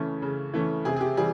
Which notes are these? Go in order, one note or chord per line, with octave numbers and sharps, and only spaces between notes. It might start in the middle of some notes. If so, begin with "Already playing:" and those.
Already playing: C#3 E3 A3 C#4
C#3
E3 A3 C#4
C3 G#4
G#4
G4
E3 G3 G#4